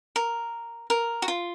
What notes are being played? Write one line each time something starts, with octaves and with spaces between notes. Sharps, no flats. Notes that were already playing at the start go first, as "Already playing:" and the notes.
A#4
A#4
F#4
F4